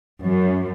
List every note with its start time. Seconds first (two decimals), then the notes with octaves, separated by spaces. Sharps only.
0.24 F#2